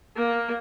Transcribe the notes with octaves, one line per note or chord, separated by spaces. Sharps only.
A#3